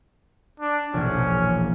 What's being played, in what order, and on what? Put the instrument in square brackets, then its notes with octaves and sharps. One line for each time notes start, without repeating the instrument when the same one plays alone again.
[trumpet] D4
[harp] E1 A#1 [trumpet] C#4